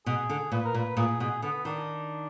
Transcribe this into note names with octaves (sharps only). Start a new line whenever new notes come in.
B2 G#4
D3
A#2 B4
A#4
A#2
B4
A#2 G#4
B2 G#4
D3 B3
D#3 D4